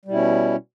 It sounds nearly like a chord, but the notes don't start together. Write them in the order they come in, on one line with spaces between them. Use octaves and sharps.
G3 B2 E4 C#4